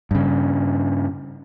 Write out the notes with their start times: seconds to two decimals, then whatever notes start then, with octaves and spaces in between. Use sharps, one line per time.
0.11 G2 C#3